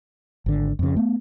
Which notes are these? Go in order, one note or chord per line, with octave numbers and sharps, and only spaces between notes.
G#1 D3
F2 C#3
A3 B3